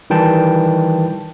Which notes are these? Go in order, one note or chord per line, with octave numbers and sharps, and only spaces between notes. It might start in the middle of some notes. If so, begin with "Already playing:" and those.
D#3 E3 G3 G5 A5